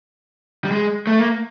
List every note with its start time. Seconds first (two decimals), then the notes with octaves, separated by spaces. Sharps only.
0.65 G3
0.71 G#3
1.07 A3
1.19 A#3